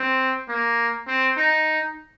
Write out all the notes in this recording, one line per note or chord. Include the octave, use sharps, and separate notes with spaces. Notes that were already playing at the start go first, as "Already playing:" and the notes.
Already playing: C4
A#3
C4
D#4